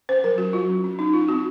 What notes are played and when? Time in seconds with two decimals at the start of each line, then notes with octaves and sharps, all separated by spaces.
0.09 C#4 C5
0.24 F#3 A#4
0.38 C#4 F#4
0.53 F#3 F4
0.69 C#4
0.84 C#4
0.99 C#4 D#4
1.14 C#4 F4
1.29 C4 F#4